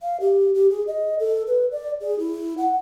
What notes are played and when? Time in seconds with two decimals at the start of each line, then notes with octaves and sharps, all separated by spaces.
0.02 F5
0.20 G4
0.54 G4
0.70 G#4
0.87 D#5
1.19 A4
1.47 B4
1.71 D5
2.01 G#4
2.19 E4
2.58 F#5